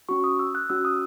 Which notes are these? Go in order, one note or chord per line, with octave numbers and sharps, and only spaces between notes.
C#4 F#4 C#6
D#6
E6
F#6
C#4 F#4 E6
D#6